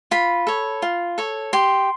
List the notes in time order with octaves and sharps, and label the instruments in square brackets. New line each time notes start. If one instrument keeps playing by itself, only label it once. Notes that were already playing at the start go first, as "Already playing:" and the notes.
[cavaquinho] F4 B5
A4 C#5
F4
A4 C#5
G4 C6